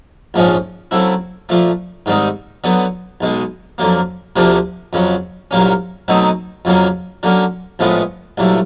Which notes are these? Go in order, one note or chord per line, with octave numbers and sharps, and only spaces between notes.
A#1 G#2 F3 G#3 C#4
C#3 F#3 A3 C4 E4
A#2 F3 A3
G#2 D#3 G3 C4 D#4
D3 F#3 B3
B1 B2 G#3
F2 D3 F#3 A#3
D2 C3 F3 A#3 D4
F2 C#3 F#3
C2 A#2 F#3 A#3 C#4
B2 F#3 A3 C4 D#4
F2 C#3 F#3 A#3 C#4
D3 F#3 A#3 C#4
A#1 A2 F3 G#3 B3
C2 A#2 F#3 A3